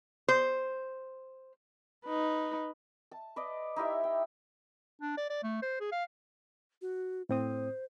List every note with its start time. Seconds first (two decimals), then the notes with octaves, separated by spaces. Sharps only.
0.28 C5
2.05 D#4 B4
3.11 A5
3.36 B4 D5 D#5
3.76 D#4 E4 G4 E5
4.04 G5
5.02 D4
5.18 D5
5.30 D5
5.43 A3
5.62 C5
5.80 G#4
5.92 F5
6.82 F#4
7.29 A2 C4 C5 D#6